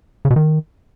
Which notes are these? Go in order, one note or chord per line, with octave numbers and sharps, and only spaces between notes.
C#3
B2
D#3